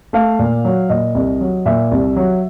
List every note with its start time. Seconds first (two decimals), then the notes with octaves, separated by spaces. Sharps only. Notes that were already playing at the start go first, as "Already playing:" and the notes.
0.13 A3 F5
0.39 A#2
0.65 F#3
0.90 A#2 D#5
1.15 C2
1.41 F#3
1.66 A#2 E5
1.91 C2
2.16 F#3